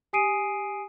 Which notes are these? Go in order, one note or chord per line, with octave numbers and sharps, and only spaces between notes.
G4 G#5 D#6 C7 D7 D#7